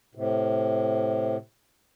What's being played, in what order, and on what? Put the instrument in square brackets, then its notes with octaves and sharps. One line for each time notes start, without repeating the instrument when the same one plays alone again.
[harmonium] A2 C3